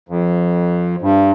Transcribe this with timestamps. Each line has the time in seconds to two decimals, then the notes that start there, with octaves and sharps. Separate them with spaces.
0.09 F2
1.02 G2